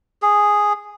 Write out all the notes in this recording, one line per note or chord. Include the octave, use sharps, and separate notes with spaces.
G#4